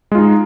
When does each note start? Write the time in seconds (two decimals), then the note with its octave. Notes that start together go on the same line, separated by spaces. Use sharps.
0.12 G#3
0.15 F4
0.18 D#4